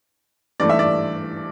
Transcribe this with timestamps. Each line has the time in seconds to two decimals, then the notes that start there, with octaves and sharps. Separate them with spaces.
0.60 G2 E3 A3 D5
0.69 E5
0.79 D5